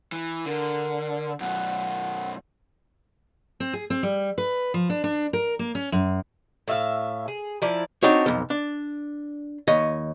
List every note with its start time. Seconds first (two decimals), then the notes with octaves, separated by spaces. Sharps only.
0.12 E3
0.46 D3 A#4
1.40 F#2 B2 F#5
3.60 C4
3.73 G#4
3.90 C4
4.03 G3
4.38 B4
4.74 F3
4.90 D4
5.04 D4
5.33 A#4
5.59 A#3
5.75 C#4
5.92 F#2
6.68 A2 E5 F5
7.28 G#4
7.62 F3 E4 A#4 D5
8.03 C4 D4 D#4 F#4 C#5
8.26 B1 F2
8.50 D4
9.68 D#2 C#5 D#5